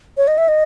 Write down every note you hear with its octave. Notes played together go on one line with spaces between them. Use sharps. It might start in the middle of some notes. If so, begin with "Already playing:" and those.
C#5
D#5
E5
D#5